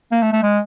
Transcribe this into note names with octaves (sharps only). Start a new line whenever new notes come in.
A#3
A3
A3
G#3